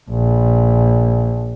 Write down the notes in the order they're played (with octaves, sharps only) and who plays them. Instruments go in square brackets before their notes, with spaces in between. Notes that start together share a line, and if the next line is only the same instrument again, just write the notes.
[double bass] A#1